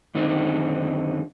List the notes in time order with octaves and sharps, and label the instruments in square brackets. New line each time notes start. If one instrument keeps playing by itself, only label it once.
[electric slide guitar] F#2 D3 D#3 C4 D#4